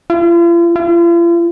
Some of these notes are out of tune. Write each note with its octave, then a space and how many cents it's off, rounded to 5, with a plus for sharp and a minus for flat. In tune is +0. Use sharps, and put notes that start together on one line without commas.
F4 -45
F4 -45